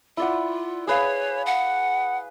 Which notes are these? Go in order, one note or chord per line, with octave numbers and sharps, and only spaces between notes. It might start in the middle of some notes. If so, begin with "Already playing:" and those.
E4 F4 D5 F#5
G#4 B4 C#5 F5
F#5